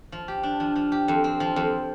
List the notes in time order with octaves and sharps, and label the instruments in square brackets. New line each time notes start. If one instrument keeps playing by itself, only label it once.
[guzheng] F3
G4
D4
F3
F3
G4
F2
C4
F3
F2